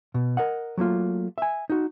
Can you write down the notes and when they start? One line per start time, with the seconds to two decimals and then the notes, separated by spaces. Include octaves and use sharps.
0.14 B2
0.37 A#4 D#5 F#5
0.77 F#3 A3 A#3 F4
1.38 E5 G#5
1.70 D#4 F#4